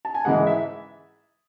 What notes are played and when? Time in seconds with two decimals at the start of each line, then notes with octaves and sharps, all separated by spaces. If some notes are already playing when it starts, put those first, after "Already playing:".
0.05 A5
0.15 G#5
0.25 G#2 E3 G#3 F#5
0.47 E5